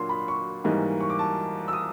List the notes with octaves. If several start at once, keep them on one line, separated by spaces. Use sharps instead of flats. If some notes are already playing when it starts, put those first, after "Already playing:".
Already playing: A#2 F#3 A#3 D4 C6
B5
C6
C#6
G#2 E3 G3 A#3 D#4
C#6
D6
A5
E6
D#6